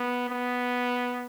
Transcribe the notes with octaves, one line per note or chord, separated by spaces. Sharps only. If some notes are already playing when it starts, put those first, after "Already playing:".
Already playing: B3
B3